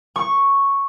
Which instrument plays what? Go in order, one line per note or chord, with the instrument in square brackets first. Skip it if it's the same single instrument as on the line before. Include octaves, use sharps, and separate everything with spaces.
[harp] C#6